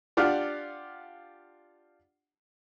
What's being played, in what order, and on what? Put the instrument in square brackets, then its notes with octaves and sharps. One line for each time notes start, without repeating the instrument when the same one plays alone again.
[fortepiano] D4 F4 G4 F5 F#5